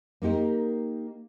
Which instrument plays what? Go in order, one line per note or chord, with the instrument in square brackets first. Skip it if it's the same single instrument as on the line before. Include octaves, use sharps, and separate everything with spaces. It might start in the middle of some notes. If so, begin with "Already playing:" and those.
[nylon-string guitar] A#3 D#4 G4 A#4